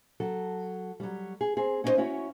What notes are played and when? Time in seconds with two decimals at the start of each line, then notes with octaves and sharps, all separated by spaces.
0.20 F#3 A4
1.00 F#3 G3
1.41 G#4
1.57 C4 G#4
1.84 C#4 D#4 E4 A#4 C5 D#5
1.98 C#4 E4 F#4 C#5